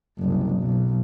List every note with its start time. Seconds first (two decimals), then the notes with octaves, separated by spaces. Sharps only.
0.19 F#1 C2
0.59 B1